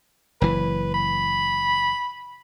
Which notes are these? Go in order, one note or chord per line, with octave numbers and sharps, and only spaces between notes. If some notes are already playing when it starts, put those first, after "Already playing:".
F#1 E3 B4
B5